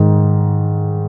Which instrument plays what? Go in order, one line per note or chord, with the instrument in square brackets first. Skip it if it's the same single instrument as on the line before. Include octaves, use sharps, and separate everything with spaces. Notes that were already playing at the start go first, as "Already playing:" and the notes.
Already playing: [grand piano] G#2 D#3